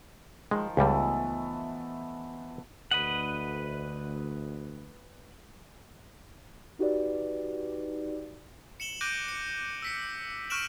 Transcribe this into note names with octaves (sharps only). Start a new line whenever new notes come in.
D#3 F3 G#3
C#2 E3 G3 A3 B3
D2 B4 D#5 F#5
D#4 F#4 G4 B4 D5
C#7 E7 F#7 G7
D6 F#6 G6 A#6 D7 D#7
C#7
E6 B6 C#7
C#6 F6 F#6 D7 E7 F#7